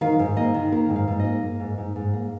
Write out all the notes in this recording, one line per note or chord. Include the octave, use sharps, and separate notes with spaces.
D#3 F5
G#2
A#3 D#5
D#3
A#3 A#4
G#2
F5
G#2
A#3 D#5
A#3
G#2
G#2
G#2
A#3